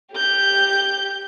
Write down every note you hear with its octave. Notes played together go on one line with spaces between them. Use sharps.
G4 G6